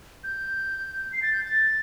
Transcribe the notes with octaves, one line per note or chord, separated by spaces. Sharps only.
G6
C7
A6
G6
A6